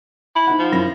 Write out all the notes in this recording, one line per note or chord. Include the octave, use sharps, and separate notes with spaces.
E4
D#4 F#5
F3
F#2 E4 A#6